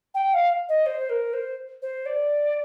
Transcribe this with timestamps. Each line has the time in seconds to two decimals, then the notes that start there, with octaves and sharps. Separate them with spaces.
0.14 G5
0.33 F5
0.69 D#5
0.86 C5
1.09 A#4
1.33 C5
1.82 C5
2.06 D5